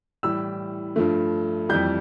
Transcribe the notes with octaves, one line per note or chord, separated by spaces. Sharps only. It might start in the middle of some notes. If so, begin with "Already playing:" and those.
A2 E3 G3 E6
G2 F3 A3
F2 E3 G3 G6